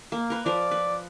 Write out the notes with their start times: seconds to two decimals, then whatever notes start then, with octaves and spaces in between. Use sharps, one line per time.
0.12 A#3
0.30 A#4 B4
0.46 F3 A#4 D5
0.71 B4